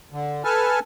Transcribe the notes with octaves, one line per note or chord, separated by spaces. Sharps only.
D3
A4 B4 G#5 A5 F6